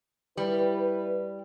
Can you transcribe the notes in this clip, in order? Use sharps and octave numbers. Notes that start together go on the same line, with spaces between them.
G3 E4 B4